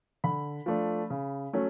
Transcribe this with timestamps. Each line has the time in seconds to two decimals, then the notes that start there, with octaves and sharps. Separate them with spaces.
0.24 D3 B5
0.66 F3 A3 D4
1.10 C#3
1.53 F#3 A3 C#4